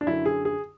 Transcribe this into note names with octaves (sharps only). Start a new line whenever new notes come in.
D4
F#2 D3 E4
G#4
G#4